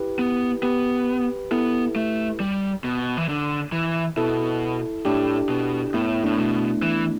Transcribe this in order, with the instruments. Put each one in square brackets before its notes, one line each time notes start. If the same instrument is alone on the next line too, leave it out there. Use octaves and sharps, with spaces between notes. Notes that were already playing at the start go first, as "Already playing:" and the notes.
Already playing: [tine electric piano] E4 G4 B4
[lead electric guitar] B3
[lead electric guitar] B3 [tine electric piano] G4 B4
[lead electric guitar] B3 [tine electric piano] E4 A4
[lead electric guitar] A3
G3
B2
E3
D3
E3
[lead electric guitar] B2 [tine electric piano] E4 A4
[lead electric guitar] A2 [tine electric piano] D4 G4
[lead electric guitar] B2
[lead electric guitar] A2 [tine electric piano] B3 E4
[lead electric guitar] A2 [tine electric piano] A3 D4
[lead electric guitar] B2
E3